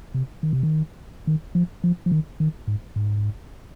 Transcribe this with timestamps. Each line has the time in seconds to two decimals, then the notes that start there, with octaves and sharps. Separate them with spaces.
0.14 C3
0.43 D#3
0.53 C3
0.63 D#3
1.27 D#3
1.55 F3
1.84 F3
2.06 F3
2.12 D#3
2.40 D#3
2.68 G#2
2.96 G#2